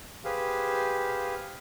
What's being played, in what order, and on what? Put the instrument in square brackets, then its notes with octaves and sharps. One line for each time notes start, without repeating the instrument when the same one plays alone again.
[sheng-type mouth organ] G4 G#4 B4 C5 F5